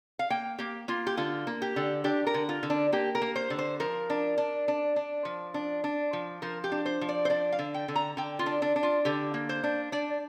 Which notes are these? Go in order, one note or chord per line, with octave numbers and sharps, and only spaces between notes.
F5
A#3 G5
A#3 G4
A#3 F4
G4
D3 F4
A#3
G4
D3
D4 G4
A#4
D3
F4
D3
D4
A#3 G4
A#4
A#3
C5
D3
C5
F3 A#4
D4
D4
D4
D4
F3
D4
D4
F3
F3 A#4
G4
D4
C5
F3
D5
C5
D4 D5
F5
D3
G5
D3
A#5
D3 G5
F4
D4
D4
D4
F4
D3 G4
A#3
C5
D4
D4 D5